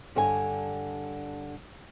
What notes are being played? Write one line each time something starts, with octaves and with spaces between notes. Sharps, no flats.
G2 D3 C#5 G#5